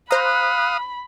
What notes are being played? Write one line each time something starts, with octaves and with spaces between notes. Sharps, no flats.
C5 F5 A#5 B5 D#6 F#6